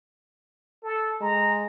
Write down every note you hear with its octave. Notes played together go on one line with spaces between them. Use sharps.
A4
G#3 A#5